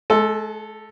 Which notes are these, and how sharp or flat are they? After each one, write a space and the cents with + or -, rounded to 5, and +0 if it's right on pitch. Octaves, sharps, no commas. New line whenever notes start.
G#3 +40 A4 +0